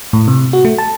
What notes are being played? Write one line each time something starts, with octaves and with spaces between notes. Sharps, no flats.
A2
C3
F#4
A3
A5